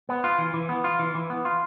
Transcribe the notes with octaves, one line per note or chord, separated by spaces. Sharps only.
B3
F4
E3
E3
B3
F4
E3
E3
B3
F4